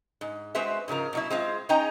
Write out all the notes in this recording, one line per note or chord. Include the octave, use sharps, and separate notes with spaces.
G#2
G#3 C4 F#4 B4 C5 E5
G#2 C#3 F3 A#4
B2 F#3 E4
G#3 C4 F4
C#4 D#4 G#4 D#5 G5 A#5